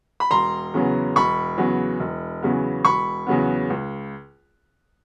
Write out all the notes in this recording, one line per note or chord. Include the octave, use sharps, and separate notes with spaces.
B5
E1 A#5 C6
E2 C#3 F#3 B3
E1 B5 C#6
E2 C#3 F#3 B3
E1
E2 C#3 F#3 B3
E1 B5 C#6
E2 C#3 F#3 B3
C#2